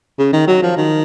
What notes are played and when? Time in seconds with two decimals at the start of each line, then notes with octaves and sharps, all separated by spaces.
0.19 C#3
0.33 D#3
0.48 F#3
0.62 F3
0.77 D#3